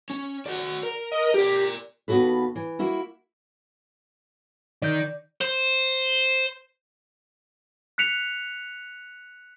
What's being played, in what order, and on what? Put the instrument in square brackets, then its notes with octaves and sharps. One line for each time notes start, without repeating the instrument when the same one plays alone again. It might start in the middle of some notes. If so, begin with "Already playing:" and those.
[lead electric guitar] C#4
F#4 D5
A#4
[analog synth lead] D#5
[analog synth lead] G4 [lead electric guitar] A#4 D5
[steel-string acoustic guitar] D#2 B3 D#4 F#4 A4 B4
E3
A#3 E4 F#4
[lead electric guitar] D#3 [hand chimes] D5 G6
[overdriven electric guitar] C5
[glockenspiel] F#6 B6 C#7 F7